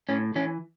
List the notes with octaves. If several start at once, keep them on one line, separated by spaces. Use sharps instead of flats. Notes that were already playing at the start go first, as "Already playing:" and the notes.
A2 C#4
E3 C#4